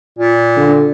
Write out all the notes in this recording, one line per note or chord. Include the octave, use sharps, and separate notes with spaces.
A#2
D3